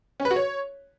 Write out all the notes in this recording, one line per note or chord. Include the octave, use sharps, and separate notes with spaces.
C#4
B4
F#4
C#5